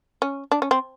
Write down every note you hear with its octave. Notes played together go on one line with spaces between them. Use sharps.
C#4
D4
C#4
C4